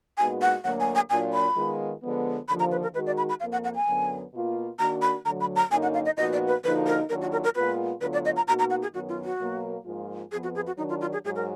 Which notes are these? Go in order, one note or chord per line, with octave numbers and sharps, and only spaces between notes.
A#2 G#3 B3 D#4 F#4 G#5
F#5
D2 D3 F#3 A#3 F#5
G#5
G#5
A#2 F#3 D4 F4 G#5
B5
D#3 G#3 B3 F4
D3 F3 G#3 B3
D#2 D3 F3 B5
A#5
B4
A#4
D#3 G#3 D#4 F#4 B4
D5
B5
B5
F2 F3 A#3 F5
F#5
F#5
G#5
F#2 D3 F#3 B3
B2 A#3 F4
D#3 A#3 D4 F#4 A#5
B5
D2 D3 F#3 A#5
B5
A#5
F#2 D3 F#3 A#3 D#4 G#5
F#5
F5
D#5
A#2 F3 B3 D#4 F#4 D#5
D5
B4
D3 F3 A#3 D#4 F#4 B4
A#4
D#2 D#3 F#3 D4 F4 A#4
F#4
A#4
A#4
A#2 G#3 B3 F4 B4
D2 D3 F#3 B3 F4 B4
D5
D#5
A#5
B2 A#3 D#4 F#4 A#5
A#5
F#5
G#4
F#2 D#3 F#3 B3 F#4
F4
F#4
B2 F#3 A#3
G#2 F3 A#3 F4
F2 F3 B3 G#4
F#4
G#4
F#4
D#3 F#3 D4 D#4
F4
F4
G#4
G#2 F#3 G#4
A#4